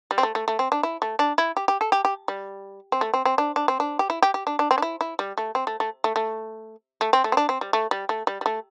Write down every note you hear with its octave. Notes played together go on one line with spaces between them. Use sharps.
G3
C4
A3
A3
A3
C4
D4
E4
A3
D4
E4
G4
G4
A4
G4
G4
G3
C4
A3
C4
C4
D4
D4
C4
D4
G4
E4
G4
G4
D4
D4
C4
D4
E4
E4
G3
A3
C4
A3
A3
A3
A3
A3
C4
A3
C4
D4
C4
G3
A3
G3
A3
G3
G3
A3